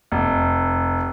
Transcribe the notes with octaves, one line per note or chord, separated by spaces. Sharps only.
F1